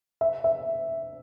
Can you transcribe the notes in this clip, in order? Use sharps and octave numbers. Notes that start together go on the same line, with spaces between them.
E5
E5